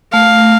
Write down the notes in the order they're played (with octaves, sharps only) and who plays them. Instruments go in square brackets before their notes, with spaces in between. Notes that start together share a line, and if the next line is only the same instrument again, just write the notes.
[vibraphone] A3 [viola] F5